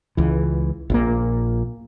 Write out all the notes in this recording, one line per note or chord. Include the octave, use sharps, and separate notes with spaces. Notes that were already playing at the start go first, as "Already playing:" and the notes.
C#2 E3
A#1 A#2 A#3